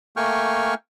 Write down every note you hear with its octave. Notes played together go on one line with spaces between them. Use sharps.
A3 A#3 G5 G#5 C#6 F6